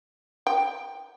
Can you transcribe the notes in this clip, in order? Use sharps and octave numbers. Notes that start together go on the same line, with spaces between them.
G5